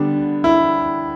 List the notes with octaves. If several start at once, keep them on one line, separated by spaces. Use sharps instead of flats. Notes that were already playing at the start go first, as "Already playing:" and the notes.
Already playing: D3 G3 B3 D4
E4